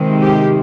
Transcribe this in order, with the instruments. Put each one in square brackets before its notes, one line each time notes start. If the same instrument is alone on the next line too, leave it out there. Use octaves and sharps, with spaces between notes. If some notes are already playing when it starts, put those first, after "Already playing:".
Already playing: [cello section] C3 D#3 G#3 C4
G4